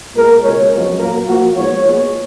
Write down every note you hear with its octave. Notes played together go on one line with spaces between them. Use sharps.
A#2 G#3 B3 A#4
C#2 B2 G#3 C#5
F#2 F3 G#3 B3
A#2 F#3 A#3 A#4
A#2 F3 A#3 F#4
G#2 F3 B3 C#5
A#2 G#3 B3